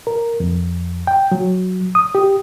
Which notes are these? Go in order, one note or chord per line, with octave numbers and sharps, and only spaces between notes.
A#4
F2
G5
F#3
D#6
G4